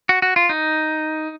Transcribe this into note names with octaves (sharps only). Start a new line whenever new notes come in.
F#4
F#4
F4
D#4